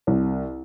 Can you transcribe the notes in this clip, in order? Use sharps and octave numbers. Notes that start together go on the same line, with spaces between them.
C2